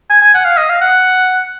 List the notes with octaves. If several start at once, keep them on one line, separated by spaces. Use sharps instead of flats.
G#5
G#5
F#5
F5
D#5
F5
F#5